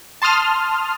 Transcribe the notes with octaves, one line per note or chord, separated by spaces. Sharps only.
A5 C6 D#6 F6